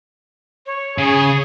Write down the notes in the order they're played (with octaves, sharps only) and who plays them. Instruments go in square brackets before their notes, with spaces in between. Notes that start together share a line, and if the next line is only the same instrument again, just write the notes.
[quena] C#5
[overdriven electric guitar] C#3 [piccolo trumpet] G#4